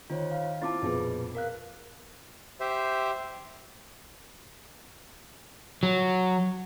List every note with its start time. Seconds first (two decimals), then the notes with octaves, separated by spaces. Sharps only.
0.10 D#3 F4 C5 C#5
0.31 F5
0.62 C4 E4 F4 A5 D6 A6
0.82 A#1 F2 B2 F4 G#4 B4
1.35 A#4 F5 F#6
2.60 G4 C5 E5
5.83 F#3